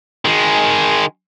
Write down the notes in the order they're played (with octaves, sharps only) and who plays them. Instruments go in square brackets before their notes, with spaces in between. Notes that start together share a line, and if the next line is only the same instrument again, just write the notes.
[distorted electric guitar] D#3 G#3